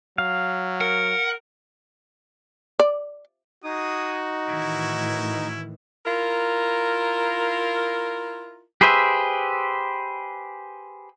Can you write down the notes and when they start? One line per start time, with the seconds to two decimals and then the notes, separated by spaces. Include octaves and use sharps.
0.18 F#3 F5
0.81 A#4 F#5
2.79 D5
3.64 G#3 D#4 F#4 G#4 D#6
4.49 A2 D#3 E3 C#4 E4
6.06 E4 F4 A#4
8.81 G4 G#4 B4 C5 E5